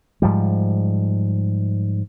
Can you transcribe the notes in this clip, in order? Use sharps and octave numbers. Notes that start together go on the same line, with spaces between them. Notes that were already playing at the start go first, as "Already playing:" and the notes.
G#2 F3 G3